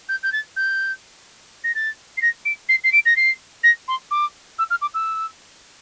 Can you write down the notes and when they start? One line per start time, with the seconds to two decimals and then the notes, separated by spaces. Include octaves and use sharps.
0.09 G6
0.23 G6
0.32 A6
0.56 G6
1.64 A#6
1.75 A6
2.17 C7
2.22 A#6
2.45 D7
2.69 C7
2.84 C7
2.92 D7
3.05 A#6
3.16 C7
3.63 A#6
3.88 C6
4.11 D6
4.58 E6
4.70 F6
4.81 D6
4.94 E6